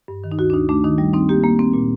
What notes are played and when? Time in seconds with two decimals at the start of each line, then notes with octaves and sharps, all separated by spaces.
0.08 G2
0.24 D#3
0.32 D#4
0.38 D2 F#4
0.50 D4
0.54 D2 D#4
0.69 A3 D4
0.84 D#3 D#4
0.98 G3
1.14 C4 D#4
1.29 A#3 G4
1.44 A#3
1.59 C4
1.73 A#2